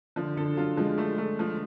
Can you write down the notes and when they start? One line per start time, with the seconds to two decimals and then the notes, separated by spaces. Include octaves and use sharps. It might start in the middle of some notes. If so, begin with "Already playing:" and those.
0.16 D3 F3
0.37 D3 A4
0.57 F#3 F4
0.77 F3 G#3
0.98 A3
1.18 A3
1.39 F3